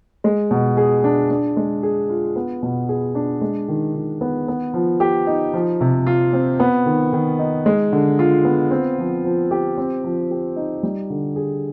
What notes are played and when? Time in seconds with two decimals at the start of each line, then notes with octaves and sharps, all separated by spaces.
0.24 G#3
0.51 B2
0.77 G#4
1.04 D4
1.30 D4
1.57 G#3
1.83 G#4
2.10 F4
2.36 B3
2.62 B2
2.89 G#4
3.15 D4
3.41 G#3
3.68 D#3
3.95 D#3
4.21 B3
4.48 B3
4.74 F3
5.00 G4
5.27 D#4
5.54 F3
5.81 C3
6.06 F4
6.33 C4
6.60 B3
6.86 D#3
7.13 D#3
7.39 D#4
7.66 G#3
7.92 D3
8.19 F4
8.45 B3
8.71 C4
8.98 F3
9.25 F3
9.51 G4
9.78 C4
10.04 F3
10.31 G4
10.56 D#4
10.83 G3
11.10 D3
11.36 G#4